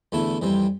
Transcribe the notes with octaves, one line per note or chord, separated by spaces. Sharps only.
E2 D3 A3 E4 A4
F2 E3 G3 C4